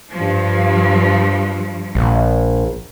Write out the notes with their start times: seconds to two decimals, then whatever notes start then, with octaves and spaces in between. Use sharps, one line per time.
0.12 G2 F3
1.95 A#1